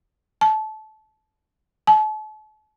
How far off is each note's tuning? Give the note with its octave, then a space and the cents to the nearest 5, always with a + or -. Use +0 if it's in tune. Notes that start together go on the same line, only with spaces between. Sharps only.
A5 -25
A5 -40